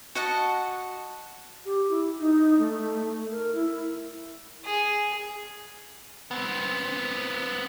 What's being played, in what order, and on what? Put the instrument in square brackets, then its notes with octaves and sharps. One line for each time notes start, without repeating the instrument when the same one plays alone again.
[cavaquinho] F#4 D#5 F#5 A5
[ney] G4
E4
D#4
A3
A#4
E4
[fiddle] G#4
[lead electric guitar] B3 C4